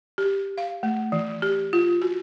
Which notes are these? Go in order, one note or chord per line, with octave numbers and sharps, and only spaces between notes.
G4
F5
A3
E3
G4
F4
F#4